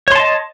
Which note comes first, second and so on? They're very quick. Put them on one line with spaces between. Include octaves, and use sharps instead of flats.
C#5 C6 A5 D#5